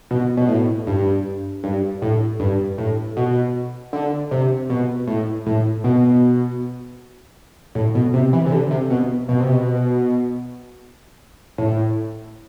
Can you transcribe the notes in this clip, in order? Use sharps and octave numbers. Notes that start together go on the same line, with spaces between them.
B2
B2
A2
G2
G2
A2
G2
A2
B2
D3
C3
B2
A2
A2
B2
A2
B2
C3
E3
C3
D3
C3
B2
B2
C3
B2
A2